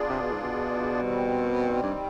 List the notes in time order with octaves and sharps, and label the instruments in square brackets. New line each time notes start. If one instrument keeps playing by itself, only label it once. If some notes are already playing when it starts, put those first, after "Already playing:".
Already playing: [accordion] B3 D4 F4 G#4 D5
[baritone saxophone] C3
B2
G#2
B2
[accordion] D#3 G3 C4
[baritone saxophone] G2